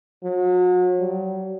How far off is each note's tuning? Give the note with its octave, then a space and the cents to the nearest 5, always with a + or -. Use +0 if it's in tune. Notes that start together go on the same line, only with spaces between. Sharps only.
F#3 -35
F#3 +45